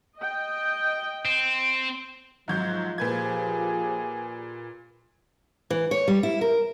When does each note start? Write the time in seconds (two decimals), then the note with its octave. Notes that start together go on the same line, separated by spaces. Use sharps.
0.16 D#5 G5
1.25 C4
2.48 G#2 F3 F#3 G6
2.98 A#2 G4 G#4 B4 G#6
5.70 E3
5.91 C#5
6.08 G3
6.23 E4
6.41 A#4